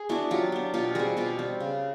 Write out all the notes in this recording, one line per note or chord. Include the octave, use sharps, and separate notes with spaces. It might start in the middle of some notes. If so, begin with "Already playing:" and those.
Already playing: G#4
B3 D4 E4 F#4
F#3 F4 G4
B3 D4
B2 F4 G4
G3 C4 F#4 G#4
B2 F4 G4
G3 C4
C#3